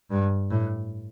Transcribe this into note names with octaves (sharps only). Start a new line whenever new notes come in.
G2
A2